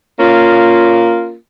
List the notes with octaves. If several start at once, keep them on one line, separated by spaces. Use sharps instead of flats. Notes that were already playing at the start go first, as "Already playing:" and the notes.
A#3 C#4 F4